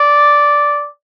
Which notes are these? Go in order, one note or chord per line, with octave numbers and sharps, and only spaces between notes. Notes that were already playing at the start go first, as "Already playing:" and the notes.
Already playing: D5